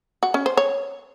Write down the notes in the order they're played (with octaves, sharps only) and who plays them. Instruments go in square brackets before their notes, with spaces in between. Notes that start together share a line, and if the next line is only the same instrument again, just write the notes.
[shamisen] F#4
C#4
C5
C#5